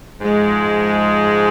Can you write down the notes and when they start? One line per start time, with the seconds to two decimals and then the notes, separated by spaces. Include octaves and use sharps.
0.21 G#2 F3 G#3